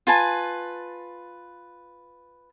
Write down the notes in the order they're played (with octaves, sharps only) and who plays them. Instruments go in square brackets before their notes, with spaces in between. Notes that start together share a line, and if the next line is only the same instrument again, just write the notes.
[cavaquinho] F4 B4 G#5 A5